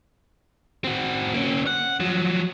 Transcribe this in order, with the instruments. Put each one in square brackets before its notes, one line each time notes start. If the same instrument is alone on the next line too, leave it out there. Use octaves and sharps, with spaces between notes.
[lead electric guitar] C4 F#4
A#3 C#4
F#5
F3 F#3